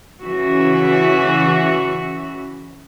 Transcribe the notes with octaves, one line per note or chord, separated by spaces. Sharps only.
C#3 E3 F#4 E5